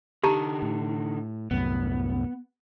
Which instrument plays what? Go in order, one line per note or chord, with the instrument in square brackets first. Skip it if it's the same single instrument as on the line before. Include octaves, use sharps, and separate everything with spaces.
[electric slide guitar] D3 D#4 [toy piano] G4 A5 A#5
[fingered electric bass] A2
[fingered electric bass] C2 F#2 A2 [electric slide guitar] B3